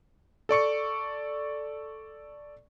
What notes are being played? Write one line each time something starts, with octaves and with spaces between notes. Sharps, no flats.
A4 D5 C#6 C#7